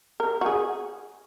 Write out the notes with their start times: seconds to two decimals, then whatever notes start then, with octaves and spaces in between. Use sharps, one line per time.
0.20 A#4
0.41 F#4
0.46 G#4